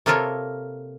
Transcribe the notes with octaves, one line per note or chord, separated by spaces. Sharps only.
C3 A#3 F4 A4 A#4 C#5